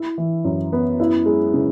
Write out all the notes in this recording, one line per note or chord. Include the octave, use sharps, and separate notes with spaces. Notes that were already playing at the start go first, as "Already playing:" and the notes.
Already playing: E4
E3
F#2
B3
E4
G#3
C#3